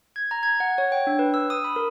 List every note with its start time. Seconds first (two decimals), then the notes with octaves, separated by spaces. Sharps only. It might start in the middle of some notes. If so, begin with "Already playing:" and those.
0.16 G#6
0.31 A#5
0.43 G#6
0.60 F#5
0.78 C#5
0.92 G5
1.07 D4
1.19 B4
1.34 E6
1.50 D#6
1.64 B5
1.76 A#4